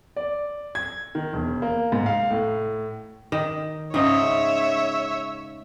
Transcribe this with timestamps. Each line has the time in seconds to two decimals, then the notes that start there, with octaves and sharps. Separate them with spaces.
0.16 D5
0.75 G#6
1.15 D#3
1.33 E1
1.62 A#3
1.92 G#2
2.06 F5
2.31 A2
3.32 D#3
3.94 G#2 C#3 D#4 C#5 E5